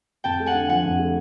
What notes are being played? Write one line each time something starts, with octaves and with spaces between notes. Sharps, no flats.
F2 G5 A5
A3
F#5 G#5
D3
F3 F#5 G#5
F2
A3